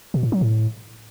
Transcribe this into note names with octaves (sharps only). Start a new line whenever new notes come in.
B2
A2
F#3
A2